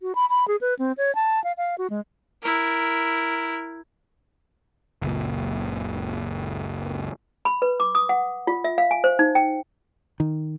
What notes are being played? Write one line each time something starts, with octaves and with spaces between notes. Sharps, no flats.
F#4
B5
B5
G#4
B4
C4
C#5
A5
F5
F5
F#4
G#3
E4 A#4
F#1 C#2 A#2
B5
B4
D6
D#6
F#5
F4
E5
F5
G#5
C5
D#4
G5
D#3